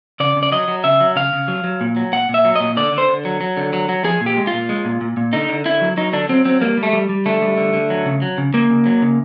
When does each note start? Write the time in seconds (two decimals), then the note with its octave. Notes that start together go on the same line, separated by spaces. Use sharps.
0.20 C#3 D5
0.36 C#3
0.43 D5
0.52 F#3 D#5
0.68 F#3
0.84 C#3 E5
1.00 F#3
1.16 C#3 F5
1.33 C#3
1.48 F#3
1.64 F#3
1.81 A#2
1.96 F#3
2.13 A#2 F#5
2.29 A#2
2.34 E5
2.45 F#3
2.56 A#2 D#5
2.77 D3 D5
2.93 D3
2.98 C5
3.09 D3
3.25 F#3
3.41 F#3
3.57 D3
3.73 F#3
3.89 F#3
4.04 F3 G#4
4.21 A#2
4.26 G4
4.37 G#3
4.47 F4
4.53 A#2
4.69 G#3
4.85 A#2
5.01 A#2
5.17 A#2
5.33 D3 D#4
5.49 D3
5.65 D3 E4
5.81 F#3
5.97 F#3 D#4
6.13 D3 D4
6.29 F#3 C4
6.45 F#3 C4
6.61 G3 A#3
6.77 G3
6.83 A3
6.93 G3
7.09 G3
7.26 D3 A3
7.42 G3
7.58 D3
7.74 D3
7.90 F#3
8.06 C#3
8.22 F#3
8.38 C#3
8.54 C#3 A#3
8.70 C#3
8.86 F#3
9.02 C#3